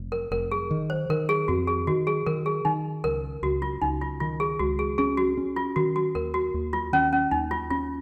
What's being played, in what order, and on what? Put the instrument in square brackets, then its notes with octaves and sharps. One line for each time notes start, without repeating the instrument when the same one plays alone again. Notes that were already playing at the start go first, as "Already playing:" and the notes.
Already playing: [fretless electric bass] F1
[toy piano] A#4
[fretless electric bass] F1 [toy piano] A#4
[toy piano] G#4
[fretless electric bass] D#3
[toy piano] C5
[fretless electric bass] D#3 [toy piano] A#4
[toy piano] G#4
[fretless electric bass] F2 [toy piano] F#4
[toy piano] G#4
[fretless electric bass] D#3 [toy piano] F#4
[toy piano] G#4
[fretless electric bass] D#3 [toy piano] A#4
[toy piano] G#4
[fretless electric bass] D#3 [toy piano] D#4
[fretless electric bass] C#2 [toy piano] A#4
[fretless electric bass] C#2 [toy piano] F#4
[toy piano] F4
[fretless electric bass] C#2 [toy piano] D#4
[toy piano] F4
[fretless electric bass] D#3 [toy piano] F4
[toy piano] G#4
[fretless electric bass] C#2 [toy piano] F#4
[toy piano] G#4
[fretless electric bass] C#4 [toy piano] G#4
[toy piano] F#4
[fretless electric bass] C#4
[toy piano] F4
[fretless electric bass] D#3 [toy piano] F#4
[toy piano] F#4
[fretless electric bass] D#2 [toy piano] A#4
[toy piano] F#4
[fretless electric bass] D#2
[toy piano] F4
[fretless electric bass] D#3 [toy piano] C#4
[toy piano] C#4
[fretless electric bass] D#2 [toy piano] D#4
[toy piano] F4
[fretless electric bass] C#4 [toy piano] F4